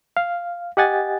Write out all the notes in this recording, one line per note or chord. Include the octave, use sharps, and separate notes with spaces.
F5
G4 D#5 F#5 G#5 A6